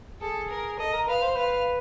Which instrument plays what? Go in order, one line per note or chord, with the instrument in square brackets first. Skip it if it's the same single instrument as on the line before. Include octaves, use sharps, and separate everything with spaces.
[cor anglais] G#4 [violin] A4
[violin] A#4
[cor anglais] A4 [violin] D#5
[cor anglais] A#4
[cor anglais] B4 [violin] F5
[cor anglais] C5
[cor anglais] B4 [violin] F5